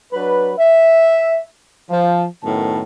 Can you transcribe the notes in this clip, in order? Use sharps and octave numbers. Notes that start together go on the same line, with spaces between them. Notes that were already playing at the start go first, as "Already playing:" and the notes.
F#3 D4 B4
E5
F3
F#2 A2 D#3 B3 A5